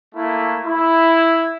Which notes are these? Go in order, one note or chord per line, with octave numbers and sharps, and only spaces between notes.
A3 A#3 E4
E4